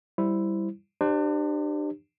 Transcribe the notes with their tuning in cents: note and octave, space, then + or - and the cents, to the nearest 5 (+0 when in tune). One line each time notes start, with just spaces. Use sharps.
G3 +0 E4 +0 C5 +0
D4 +35 G4 +0 C5 +0